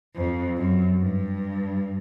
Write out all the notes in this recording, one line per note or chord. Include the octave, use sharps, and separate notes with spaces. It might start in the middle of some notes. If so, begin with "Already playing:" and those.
F2
F#2
G2